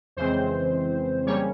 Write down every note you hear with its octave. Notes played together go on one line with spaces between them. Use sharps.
F2 C#3 E3 G#3 C4 C5
C#3 G3 A#3 C#4 C#5